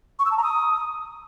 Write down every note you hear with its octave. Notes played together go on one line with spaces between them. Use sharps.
C#6
E6
A5
A#5
D#6